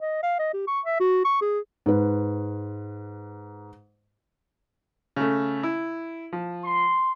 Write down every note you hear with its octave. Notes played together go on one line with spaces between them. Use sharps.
D#5
F5
D#5
G4
C#6
E5
F#4
C#6
G#4
G#2 B4
C#3 A3
E4
F3
C6